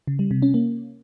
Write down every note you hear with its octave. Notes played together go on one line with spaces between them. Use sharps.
C#3
G3
C3
C#4
A#3